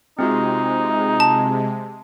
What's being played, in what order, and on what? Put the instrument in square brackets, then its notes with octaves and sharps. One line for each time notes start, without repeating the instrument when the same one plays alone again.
[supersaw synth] C3 G#3 [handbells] C4 F4 F#4 [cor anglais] D#4
[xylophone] A5